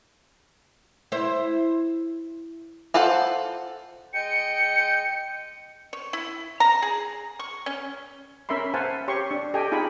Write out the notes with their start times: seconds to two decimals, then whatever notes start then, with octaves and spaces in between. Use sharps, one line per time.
1.12 E4 C5
2.94 F4 A4 C5 F#5
4.14 G#3 D#5 G5 C#7
5.93 C#5
6.13 E4
6.60 A#5
6.82 G#4
7.39 C#6
7.66 C#4
8.49 C#4 A#4 E5 B5 C6
8.74 C5 F5 F#5 G#5 A5
9.08 G4 C#5 C6 C#6
9.31 D4
9.54 G4 A4 D#5 G5 G#5
9.72 D#4 F4 G#4 G#5 B5